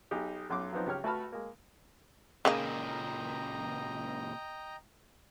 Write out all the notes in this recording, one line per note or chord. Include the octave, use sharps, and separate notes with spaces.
B1 D#4 G4 G#4
B1 F#2 C6 D6
F3 F#3 B3 C4 D#4
C#2 G4 C#5 F6
A3 F#4 B4 A5 B5 F6
G#3 A#3
C#2 A#2 C#3 A#3 D#4 D#5 G5 A#5